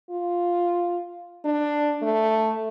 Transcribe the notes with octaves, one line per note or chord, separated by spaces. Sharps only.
F4
D4
A3